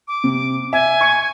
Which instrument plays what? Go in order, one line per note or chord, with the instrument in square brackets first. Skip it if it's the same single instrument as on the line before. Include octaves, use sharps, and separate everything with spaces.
[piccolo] D6
[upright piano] C3
[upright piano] E5 [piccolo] G#5
[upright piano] C#6 C#7